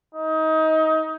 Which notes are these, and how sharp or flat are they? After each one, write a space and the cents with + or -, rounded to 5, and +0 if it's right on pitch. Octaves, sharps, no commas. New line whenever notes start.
D#4 +25